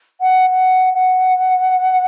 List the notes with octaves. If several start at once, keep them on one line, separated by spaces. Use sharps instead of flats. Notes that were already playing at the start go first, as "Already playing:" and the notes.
F#5
F#5
F#5